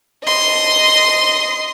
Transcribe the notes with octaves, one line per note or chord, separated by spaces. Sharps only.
D#5 C6